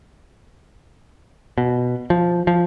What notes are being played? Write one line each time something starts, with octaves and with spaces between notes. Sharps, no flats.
B2
F3
F3